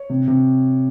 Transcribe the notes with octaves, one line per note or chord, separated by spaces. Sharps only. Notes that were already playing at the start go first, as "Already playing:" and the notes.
Already playing: C#5
C3
C3